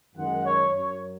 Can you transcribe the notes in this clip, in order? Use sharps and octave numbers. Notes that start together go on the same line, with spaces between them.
F#2 D#3 G#3 F#5
C#5
F#2 F#3 C#5